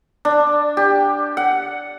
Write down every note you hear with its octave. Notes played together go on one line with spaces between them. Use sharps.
D4
G4
F#5